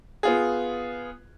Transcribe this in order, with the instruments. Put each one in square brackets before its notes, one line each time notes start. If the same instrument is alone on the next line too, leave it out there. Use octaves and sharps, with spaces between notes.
[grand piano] B3 F4 G#4